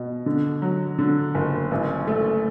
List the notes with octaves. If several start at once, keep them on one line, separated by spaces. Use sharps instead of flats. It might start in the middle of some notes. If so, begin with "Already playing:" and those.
Already playing: B2
D3
F#3
D3
F#1
A1
A3